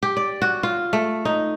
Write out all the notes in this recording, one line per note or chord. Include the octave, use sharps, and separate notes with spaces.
G4
D5
F#4
F4
A3
D#4